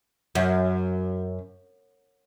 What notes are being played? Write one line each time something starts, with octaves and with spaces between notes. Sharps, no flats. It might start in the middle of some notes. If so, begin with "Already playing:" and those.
F#2